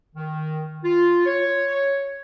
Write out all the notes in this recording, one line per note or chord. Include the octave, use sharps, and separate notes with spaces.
D#3
F4
C#5